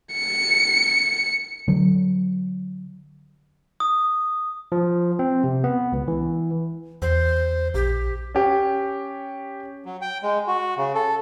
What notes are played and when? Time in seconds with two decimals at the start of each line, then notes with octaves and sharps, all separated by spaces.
0.14 C#7
1.68 D3 F#3
3.80 D#6
4.72 F3
5.19 C4
5.44 C3
5.64 B3
5.92 C#2
6.08 E3
7.02 E2 C5
7.74 A#1 G4
8.35 C#4 G4
9.85 F#3
10.01 G5
10.23 G#3
10.47 F#4
10.77 C#3
10.95 A4